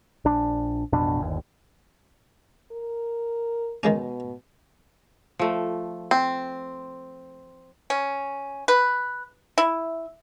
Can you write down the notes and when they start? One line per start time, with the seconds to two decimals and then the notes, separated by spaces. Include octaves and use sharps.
0.25 A#1 D4
0.93 A1 F2 B2 D4
1.20 G1 D#2
2.72 A#4
3.83 B2 D#3 G#3 C#4
5.39 F3 A3
6.11 C4
7.90 C#4
8.68 B4
9.58 E4